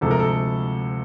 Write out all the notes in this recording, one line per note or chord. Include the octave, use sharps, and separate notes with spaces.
D2 C3 F3 G#3 A4
A#4
A4